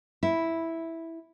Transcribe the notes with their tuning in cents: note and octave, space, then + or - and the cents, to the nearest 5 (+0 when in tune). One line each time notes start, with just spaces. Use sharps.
E4 -5